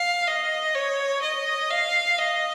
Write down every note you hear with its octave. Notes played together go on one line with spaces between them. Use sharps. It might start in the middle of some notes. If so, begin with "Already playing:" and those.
Already playing: F5
D#5
C#5
D#5
F5
D#5